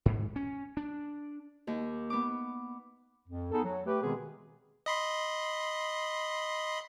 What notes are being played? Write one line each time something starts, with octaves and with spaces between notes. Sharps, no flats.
G#2
C#4
D4
D#2
B3 D6
F2
B3 D#4 G#4 A4
F#3
A3 G4 B4
B2 D#3 G#3 B3 C4 G#4
D#5 B5 C6